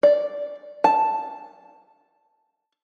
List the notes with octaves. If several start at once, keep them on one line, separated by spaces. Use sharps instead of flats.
D5
A5